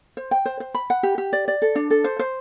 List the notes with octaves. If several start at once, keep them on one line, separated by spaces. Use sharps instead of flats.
C5
G5
C5
C5
B5
F#5
G4
G4
D5
D5
A4
D4
A4
C5
C5